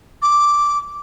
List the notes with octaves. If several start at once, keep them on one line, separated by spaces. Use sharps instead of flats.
D6